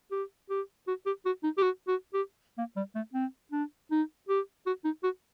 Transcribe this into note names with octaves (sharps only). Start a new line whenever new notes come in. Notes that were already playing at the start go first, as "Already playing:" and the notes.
G4
G4
F#4
G4
F#4
D#4
G4
F#4
F#4
G4
A#3
G3
A3
C4
D4
D#4
G4
F#4
D#4
F#4